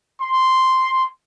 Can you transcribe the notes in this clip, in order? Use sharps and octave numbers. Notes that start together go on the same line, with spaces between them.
C6